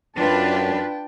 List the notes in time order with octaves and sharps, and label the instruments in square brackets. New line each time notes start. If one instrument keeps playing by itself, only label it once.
[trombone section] F#2 [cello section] D4 F4 B4 [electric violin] G5 A5